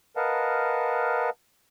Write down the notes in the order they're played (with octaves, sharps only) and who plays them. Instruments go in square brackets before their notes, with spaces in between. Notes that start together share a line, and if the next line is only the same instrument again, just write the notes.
[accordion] A#4 B4 D#5 F5 F#5 A5